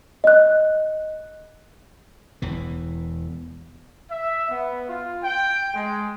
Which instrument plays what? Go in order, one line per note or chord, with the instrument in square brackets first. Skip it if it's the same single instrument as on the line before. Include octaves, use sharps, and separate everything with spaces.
[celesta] D#5 F#6
[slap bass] E1 E2 E3
[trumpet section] E5
B3
F4
G5
G#3